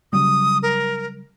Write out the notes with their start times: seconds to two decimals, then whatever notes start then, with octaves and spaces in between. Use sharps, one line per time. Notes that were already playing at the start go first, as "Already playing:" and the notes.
0.13 C#3 F#3 G3 D#6
0.63 A#4